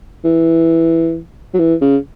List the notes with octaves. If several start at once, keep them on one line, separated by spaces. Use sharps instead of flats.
E3
F#3
E3
C#3